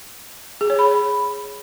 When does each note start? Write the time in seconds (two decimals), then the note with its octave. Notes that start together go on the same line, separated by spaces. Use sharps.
0.61 G#4
0.70 C#5
0.79 B5